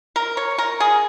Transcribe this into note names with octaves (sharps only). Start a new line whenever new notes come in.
A#4
C#5
A#4
G#4